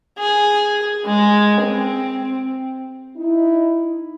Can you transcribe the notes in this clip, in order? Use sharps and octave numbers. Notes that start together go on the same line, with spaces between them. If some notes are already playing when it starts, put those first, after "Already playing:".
G#4
G#3
C4
D#4 E4